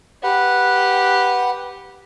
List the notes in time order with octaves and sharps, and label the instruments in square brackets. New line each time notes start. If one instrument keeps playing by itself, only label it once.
[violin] G4 [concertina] B4 F#5